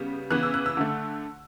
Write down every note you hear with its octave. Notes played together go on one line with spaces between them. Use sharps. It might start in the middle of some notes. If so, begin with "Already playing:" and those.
Already playing: C#3 G3 B3
C#3 E3 B3 F#6
E6
F#6
E6
D3 A3